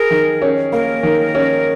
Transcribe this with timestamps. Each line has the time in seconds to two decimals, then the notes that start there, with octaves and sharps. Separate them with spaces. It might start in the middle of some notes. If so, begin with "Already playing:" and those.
Already playing: G#4 A#4
0.10 D#3
0.42 C#4
0.72 A#3 A#4
1.03 D#3
1.35 C#4